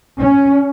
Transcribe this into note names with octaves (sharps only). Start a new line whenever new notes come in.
C#4